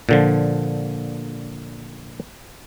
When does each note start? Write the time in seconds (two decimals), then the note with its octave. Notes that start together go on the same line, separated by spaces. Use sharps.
0.09 A#2 D3 F3